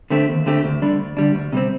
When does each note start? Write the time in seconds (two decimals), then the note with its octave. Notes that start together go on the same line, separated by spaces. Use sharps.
0.10 D3 A3 C4 G4
0.29 D#2
0.46 D3 A3 C4 G4
0.64 D2
0.82 D3 G3 D4
0.99 D2
1.17 D3 G3 D4
1.35 D2
1.52 C3 G3 C4